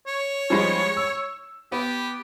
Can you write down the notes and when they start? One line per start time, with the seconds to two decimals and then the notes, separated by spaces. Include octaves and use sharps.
0.07 C#5
0.50 F3 G3 G#3
0.97 E6
1.72 B3 G4